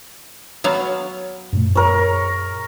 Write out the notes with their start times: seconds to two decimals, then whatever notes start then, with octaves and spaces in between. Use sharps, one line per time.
0.64 F#3 B3 F5
1.53 F#2 A#2 A3
1.75 A#4 C#5